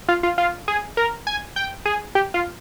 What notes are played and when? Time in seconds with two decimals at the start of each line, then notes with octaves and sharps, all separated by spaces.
0.08 F4
0.23 F4
0.38 F4
0.68 G#4
0.97 A#4
1.27 G#5
1.56 G5
1.85 G#4
2.15 G4
2.34 F4